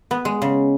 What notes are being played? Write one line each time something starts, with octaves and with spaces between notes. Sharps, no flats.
B3
G#3
C#3